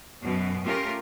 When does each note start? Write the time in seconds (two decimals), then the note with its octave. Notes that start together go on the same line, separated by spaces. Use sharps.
0.24 F#2 B2
0.65 A3 C#4 F4 G4 A#4